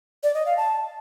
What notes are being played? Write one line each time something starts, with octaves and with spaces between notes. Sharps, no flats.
D5
D#5
F5
A5